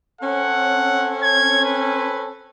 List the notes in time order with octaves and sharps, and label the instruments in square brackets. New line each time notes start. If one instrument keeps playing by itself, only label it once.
[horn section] C4 C#4 A4 [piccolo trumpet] F#5
[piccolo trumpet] G#6
B4